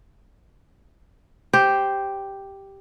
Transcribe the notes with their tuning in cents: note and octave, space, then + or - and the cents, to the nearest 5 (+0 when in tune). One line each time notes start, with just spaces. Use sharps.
G4 +0 C5 +0